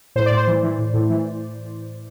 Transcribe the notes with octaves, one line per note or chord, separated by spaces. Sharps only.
A2 C5
D5
A2
C5
E3
E3
A2
A2
E3